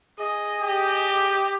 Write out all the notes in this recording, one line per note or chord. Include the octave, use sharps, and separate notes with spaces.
G#4 D#5
G4